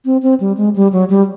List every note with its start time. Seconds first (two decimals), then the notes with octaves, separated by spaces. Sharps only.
0.05 C4
0.22 C4
0.40 G3
0.57 G#3
0.76 G3
0.92 F#3
1.10 G3